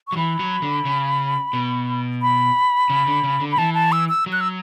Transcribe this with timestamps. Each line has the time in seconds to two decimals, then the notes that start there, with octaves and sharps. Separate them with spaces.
0.08 C#6
0.12 F#3
0.17 E3 B5
0.39 F#3
0.62 D3
0.85 C#3
1.53 B2
2.22 B5
2.90 C#3
3.06 D3
3.23 C#3
3.40 D3
3.52 B5
3.58 E3 A5
3.74 A5
3.92 E6
4.09 E6
4.26 F#3
4.33 F#6
4.41 E6